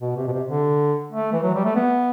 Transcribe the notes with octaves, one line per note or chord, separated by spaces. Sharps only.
B2
C3
B2
C3
D3
A3
E3
F#3
G3
A3
B3